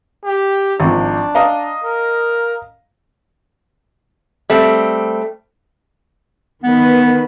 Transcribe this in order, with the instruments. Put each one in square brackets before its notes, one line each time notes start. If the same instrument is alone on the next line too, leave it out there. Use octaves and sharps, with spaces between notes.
[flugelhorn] G4
[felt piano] G#1 F3 [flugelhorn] D4
[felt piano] D#5 F5 A#5
[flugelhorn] A#4
[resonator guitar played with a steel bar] G3 A3 C4
[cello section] D#3 B4 [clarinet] B3